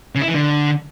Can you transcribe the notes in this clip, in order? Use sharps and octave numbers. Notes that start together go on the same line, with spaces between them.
C#3
E4
E3
D3